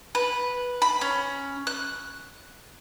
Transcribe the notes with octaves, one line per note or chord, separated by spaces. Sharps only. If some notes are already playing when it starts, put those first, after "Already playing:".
B4
B5
C#4
F#6